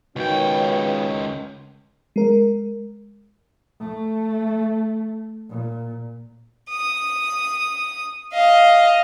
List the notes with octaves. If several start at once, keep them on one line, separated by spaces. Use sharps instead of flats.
C#2 B2 D#3 C#4 G5
G#3 A#4
A3
A#2
D#6
D#5 F5